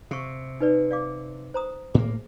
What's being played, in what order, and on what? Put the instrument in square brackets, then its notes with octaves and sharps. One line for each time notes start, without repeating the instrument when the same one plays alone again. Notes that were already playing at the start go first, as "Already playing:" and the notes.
[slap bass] C3 [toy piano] F5 C#6
[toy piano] D#4 B4 D5
D5 F5 D6
C5 A#5 D#6
[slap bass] A2 A#3 [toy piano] G#4